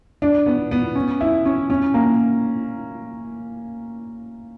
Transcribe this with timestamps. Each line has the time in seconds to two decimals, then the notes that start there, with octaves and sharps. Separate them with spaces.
0.22 D4
0.46 B3
0.71 B3
0.95 C#4
1.21 E4
1.45 C#4
1.70 C#4
1.94 A#3